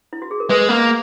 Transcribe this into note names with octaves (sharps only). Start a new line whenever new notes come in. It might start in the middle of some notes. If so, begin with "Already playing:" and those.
E4
F#4
G#4
A#4
G#3 B4
A#3